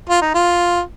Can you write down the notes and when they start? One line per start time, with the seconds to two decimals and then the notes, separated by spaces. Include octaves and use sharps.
0.09 F4
0.22 D#4
0.35 F4